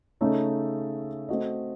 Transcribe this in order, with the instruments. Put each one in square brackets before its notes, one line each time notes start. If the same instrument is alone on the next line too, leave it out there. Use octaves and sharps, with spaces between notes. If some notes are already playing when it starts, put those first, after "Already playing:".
[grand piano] C#3 A3 D#4 A4 C#5
A3 C4 F#4 A4 D#5